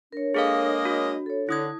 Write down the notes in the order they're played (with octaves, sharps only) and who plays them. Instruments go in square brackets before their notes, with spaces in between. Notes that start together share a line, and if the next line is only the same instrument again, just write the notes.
[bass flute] D4 [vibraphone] A#4 C#5
[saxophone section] G#3 A#3 D#5 [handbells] G#4 A4 F5
[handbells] F#4
[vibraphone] A4 C#5
[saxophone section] D3 [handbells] E4 D#6 G#6